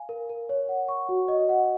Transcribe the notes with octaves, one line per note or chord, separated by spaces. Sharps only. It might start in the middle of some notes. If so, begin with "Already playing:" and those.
Already playing: F5 G#5
A#4
A#4
C#5
F#5
C#6
F#4
D#5
F#5